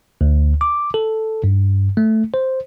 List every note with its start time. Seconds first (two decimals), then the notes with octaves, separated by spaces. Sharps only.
0.21 D2
0.61 D6
0.94 A4
1.44 G2
1.97 A3
2.34 C5